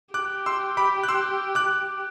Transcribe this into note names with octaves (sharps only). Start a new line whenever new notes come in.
G4 D6 F#6
C6 E6
B5 D6
F#6
C6 E6
D6 F#6